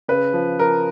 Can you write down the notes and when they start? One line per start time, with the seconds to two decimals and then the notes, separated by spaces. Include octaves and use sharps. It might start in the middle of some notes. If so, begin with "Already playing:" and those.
0.08 C#3 B4
0.33 F3
0.59 F3 A#4